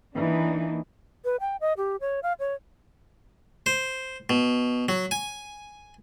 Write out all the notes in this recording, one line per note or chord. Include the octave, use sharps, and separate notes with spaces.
E3 A#3 D4 D#4
B4
G5
D#5
G4
C#5
F5
C#5
C5
B2
F#3
G#5